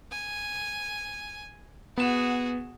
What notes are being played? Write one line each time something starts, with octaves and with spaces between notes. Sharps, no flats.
G#5
B3 F#4 G#4 E7